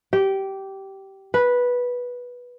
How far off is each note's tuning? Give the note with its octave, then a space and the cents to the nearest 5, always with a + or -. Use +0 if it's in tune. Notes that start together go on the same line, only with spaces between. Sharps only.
G4 -15
B4 -10